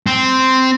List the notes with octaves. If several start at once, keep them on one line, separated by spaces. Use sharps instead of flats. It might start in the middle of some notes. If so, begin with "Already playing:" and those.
C4